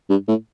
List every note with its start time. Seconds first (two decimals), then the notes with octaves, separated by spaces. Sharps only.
0.10 G2
0.28 A2